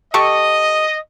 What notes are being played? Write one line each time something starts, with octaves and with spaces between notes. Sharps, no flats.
G4 A4 D#5 C#6